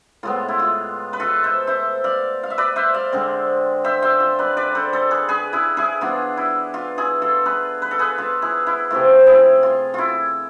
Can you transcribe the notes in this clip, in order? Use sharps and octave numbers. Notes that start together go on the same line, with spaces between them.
A2 G#3 B3 F4
E4
F4
B4
F4 A4
C5 E5
C5 E5
D5 F5
F5
E5
B4 D5
C5 E5
D5 F5
D3 G#3 C4
C5 E5
C5 E5
F4
B4 D5
B4 D5
A4 C5
A4 C5
G#4 B4
G#4 B4
E4 G#4
E4 G#4
E3 B3 D4 F4
E4
F4
E4 G#4
F4 A4
G#4 B4
B4
A4
G#4 B4
F4 A4
E4 G#4
E4
C3 F3 A3 E4 F4
E4 G#4
F4
E4 F4